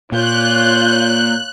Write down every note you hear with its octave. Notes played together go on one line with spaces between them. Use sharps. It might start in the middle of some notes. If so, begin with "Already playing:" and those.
A#2 F4 C#5 F#6 G6